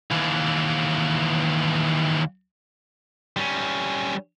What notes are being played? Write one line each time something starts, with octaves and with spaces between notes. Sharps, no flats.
D#2 E3
G3 C#4